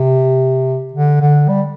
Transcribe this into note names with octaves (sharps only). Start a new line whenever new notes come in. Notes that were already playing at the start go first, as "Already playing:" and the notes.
Already playing: C3
D3
D3
G3